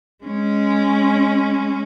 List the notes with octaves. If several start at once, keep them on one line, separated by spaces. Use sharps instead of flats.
G#3 C#4